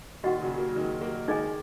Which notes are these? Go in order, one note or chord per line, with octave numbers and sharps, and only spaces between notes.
A#2 D#3 F#4 D#5 F#5 C#6
C#3 F#3
F#3 A#3
F#3
D#3 G#3
F#3 A#3
D#3 G#3 D#4 G#4 D#5 G#5